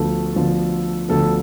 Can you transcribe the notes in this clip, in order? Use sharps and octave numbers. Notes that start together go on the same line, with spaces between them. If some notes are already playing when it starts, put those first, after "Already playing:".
Already playing: D2 D3 F3 B3 A4
D2 D3 F3 B3
D2 D3 F3 B3 A4